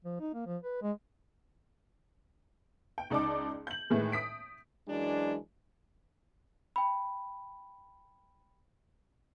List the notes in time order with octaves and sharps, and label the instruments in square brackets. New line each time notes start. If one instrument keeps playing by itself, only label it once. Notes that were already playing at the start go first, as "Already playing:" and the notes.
[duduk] F3
D#4
A#3
F3
B4
G#3
[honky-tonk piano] G5
C#2 D#4 D5 A5 D6
G6 F#7
A2 D#3 E3 G#3
D#6 B6 D7
[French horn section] F#2 E3 G#3 D4
[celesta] G5 B5